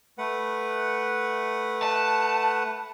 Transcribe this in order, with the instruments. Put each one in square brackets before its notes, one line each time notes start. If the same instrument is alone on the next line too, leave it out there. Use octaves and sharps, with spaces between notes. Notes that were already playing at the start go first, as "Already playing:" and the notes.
[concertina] A3 B4 F#5
[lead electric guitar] A5